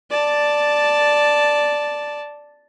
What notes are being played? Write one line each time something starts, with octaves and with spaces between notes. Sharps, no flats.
D5 A5